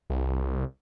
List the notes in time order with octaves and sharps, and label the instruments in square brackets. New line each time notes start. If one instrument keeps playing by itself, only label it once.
[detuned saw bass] C2